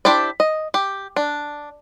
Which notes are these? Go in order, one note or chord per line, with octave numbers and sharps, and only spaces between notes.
D4 E4 G4 C5 D5
D#5
G4
D4